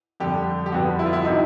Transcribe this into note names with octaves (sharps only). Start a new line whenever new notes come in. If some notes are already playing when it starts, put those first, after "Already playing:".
F2 D3 G3 G4
G4
F2 D3 G3 B3 F#4
E4
F4
E4
C3 D#3 F#3 D#4